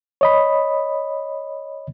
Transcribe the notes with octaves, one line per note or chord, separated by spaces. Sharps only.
C#5 D#5 B5